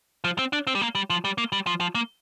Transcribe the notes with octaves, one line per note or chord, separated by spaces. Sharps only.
F3
C4
D4
C4
G3
A#3
G3
F3
G3
A#3
G3
F3
F3
A#3